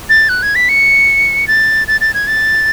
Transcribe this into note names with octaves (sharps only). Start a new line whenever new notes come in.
A6
F#6
G#6
B6
C#7
A6
A6
A6
G#6
A6